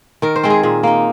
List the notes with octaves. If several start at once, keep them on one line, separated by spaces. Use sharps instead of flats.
D#3 A#4
C5
G#3 C4
G#4
A#2 G#4
A#3 D#4